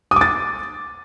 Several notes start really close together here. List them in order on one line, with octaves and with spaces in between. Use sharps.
D#6 D6 A6